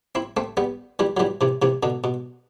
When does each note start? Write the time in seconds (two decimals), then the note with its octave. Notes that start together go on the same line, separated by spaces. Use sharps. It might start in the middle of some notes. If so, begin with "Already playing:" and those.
0.15 C4 E4
0.37 A3 C4
0.57 G3 B3
0.99 E3 G3
1.17 F#3
1.19 E3 G3
1.41 C3 E3
1.62 C3 E3
1.83 B2 D3
2.04 B2